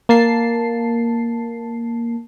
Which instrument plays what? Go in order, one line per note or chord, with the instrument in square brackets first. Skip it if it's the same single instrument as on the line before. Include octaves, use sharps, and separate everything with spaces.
[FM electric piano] A#3 A5 C7